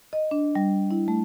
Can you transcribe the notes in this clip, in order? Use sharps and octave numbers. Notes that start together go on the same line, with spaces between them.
D#5
D4
G3
E4
A3